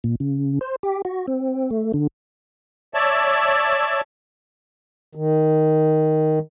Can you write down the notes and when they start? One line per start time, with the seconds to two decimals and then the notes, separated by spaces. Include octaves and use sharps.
0.04 A#2
0.20 C#3
0.61 C5
0.83 G4
1.05 F#4
1.27 C4
1.71 A3
1.94 D3
2.94 C#5 D5 E5 A5
5.15 D#3